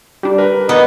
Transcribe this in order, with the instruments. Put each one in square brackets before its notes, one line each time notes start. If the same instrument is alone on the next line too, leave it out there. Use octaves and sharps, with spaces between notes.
[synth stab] G3 D4
[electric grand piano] A#4 B4
[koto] B3 [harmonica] D#4 D#5